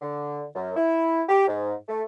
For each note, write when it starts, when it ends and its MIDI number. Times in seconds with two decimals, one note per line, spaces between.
0.02 0.43 50
0.55 0.72 42
0.76 1.22 64
1.29 1.47 67
1.48 1.73 44
1.89 2.03 57